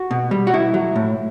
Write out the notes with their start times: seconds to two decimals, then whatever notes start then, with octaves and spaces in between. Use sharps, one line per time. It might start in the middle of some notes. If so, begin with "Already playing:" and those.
Already playing: F#4
0.11 B2
0.31 G3
0.47 F#4
0.53 B2 E4
0.74 F#3
0.96 A2